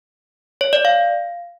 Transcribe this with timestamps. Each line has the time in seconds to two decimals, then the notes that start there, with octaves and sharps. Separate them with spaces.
0.61 C#5
0.73 D5
0.85 F5